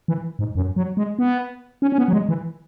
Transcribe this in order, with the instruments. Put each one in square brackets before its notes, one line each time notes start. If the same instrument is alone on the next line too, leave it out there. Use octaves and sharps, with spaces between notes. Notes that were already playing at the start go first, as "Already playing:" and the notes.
[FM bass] E3
G#2
F#2
F#3
G#3
B3
C#4
C#4
B3
F#3
G#3
E3